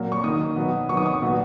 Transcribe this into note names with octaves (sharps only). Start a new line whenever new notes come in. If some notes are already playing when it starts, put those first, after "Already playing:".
Already playing: A#2 F#3 A#3
C#6
D#3 A#3 D#6
B2 F#3 B3
D#3 F#3 B3 C#6
D#6
C#6
D#6
A#2 F#3 B3